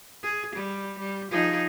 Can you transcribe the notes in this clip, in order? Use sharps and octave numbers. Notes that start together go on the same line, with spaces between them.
G#4
G3
G3
F3 D#4 G#4